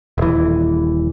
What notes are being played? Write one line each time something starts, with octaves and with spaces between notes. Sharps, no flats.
D#1 E3